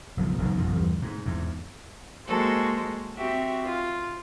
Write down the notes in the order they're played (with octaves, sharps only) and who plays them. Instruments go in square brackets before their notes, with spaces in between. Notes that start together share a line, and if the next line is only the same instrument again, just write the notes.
[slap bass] F#1 B1 F3
F#1 B1 G#2 D#3
A1 F2 B2 F3
G1 E2 G3
G#2
E2 G#2
[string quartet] G#3 A#3 F#4 A4 C5
C4 F#4 G4 E5
F4